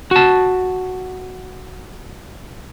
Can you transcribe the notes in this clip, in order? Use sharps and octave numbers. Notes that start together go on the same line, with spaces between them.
F#4 A5